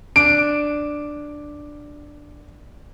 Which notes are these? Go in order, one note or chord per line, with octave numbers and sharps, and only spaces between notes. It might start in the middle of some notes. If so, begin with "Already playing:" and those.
D4 D7